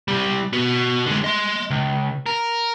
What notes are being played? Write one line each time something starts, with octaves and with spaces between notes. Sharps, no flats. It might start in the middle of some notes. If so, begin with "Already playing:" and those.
C2 G3
B3 F#4
D3 G#3
D#5 C6
C#2
A#4